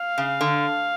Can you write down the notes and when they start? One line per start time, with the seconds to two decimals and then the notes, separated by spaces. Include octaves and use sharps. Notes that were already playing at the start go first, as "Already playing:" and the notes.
Already playing: F5
0.18 C#3
0.41 D3